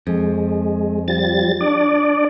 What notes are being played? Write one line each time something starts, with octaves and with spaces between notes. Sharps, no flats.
F2 G#3
F3 G3 A6
D4 D5